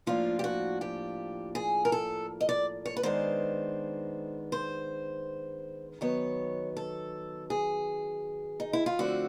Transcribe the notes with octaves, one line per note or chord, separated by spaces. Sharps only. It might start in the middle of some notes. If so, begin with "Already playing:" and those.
A2 F3 A#3 D4 F4
G4
F#4
G4
G#4
A#4
A4
D#5
D5
C#5
B4
D#3 G#3 B3 D4 C5
C5
D#3 F#3 B3 C#5
A4
G#4
D#4
E4
F4
D3 F3 A3 C4 F#4